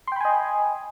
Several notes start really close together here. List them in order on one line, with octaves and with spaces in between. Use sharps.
C6 G5 B5 G#5 D#5